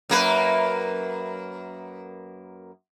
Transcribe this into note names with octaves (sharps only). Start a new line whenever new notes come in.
F#2 A#3 B4